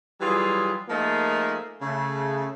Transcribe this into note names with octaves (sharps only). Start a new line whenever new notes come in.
E3 F#3 G3 F4 G#4
F3 A3 A#3 D#4 G#4 A#4
C#3 A3